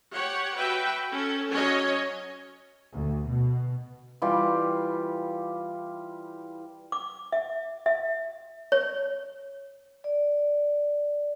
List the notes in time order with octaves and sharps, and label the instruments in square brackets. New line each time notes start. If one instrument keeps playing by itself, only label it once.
[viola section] G4 C#5 F#5
F#4 B4 E5 G5
C#4 A4
F#3 C#4 C#5 D#5
[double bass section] D2
B2
[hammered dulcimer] E3 G3 F4 G4
[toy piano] D6
E5
E5
C#5
[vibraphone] D5